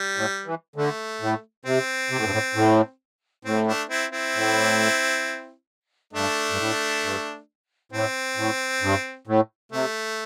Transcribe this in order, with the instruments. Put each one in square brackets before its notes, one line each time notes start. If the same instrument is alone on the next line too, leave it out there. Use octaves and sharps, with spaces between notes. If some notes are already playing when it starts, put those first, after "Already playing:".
Already playing: [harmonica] G3
[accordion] A2
E3
[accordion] D3 [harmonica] A3
[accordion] A2
[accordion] C3 [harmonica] C4
[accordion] C3
A2
G2
A2
A2
[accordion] A2 [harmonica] C4
[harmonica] A3 D4
C4 E4
C4 E4
[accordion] A2
[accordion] G2 [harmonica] A3 D4
[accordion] G2
A2
G2
[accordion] A2 [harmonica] C4
[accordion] A2
G2
A2
[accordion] C3 [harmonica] A3